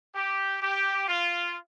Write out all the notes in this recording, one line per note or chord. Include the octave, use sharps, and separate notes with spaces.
G4
G4
F4